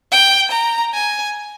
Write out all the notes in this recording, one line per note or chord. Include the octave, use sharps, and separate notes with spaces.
G5
A#5
G#5